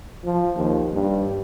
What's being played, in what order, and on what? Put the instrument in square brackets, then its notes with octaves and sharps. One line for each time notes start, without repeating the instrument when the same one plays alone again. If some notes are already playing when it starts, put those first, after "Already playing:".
[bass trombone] F3
D#2
G2